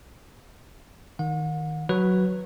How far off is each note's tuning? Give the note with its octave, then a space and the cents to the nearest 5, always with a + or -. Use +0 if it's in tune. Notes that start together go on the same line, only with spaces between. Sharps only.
D#3 +0 F#5 -40
F#3 +0 F#4 +0 B4 +0